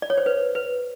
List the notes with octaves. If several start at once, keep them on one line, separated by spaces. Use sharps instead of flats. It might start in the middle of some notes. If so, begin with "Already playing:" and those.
D5
C#5
C5
B4
B4